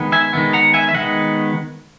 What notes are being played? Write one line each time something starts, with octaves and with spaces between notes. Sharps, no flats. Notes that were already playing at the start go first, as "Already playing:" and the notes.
Already playing: D#3 G#3 B3
E5 G#5
D#3 G#3 B3
F#5 A#5
E5 G#5
E5
D#3 G#3 B3 D#5 F#5